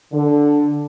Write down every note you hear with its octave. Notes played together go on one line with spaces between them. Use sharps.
D3